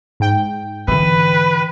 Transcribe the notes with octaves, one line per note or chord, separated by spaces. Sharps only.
G#2 G5
D3 E3 B4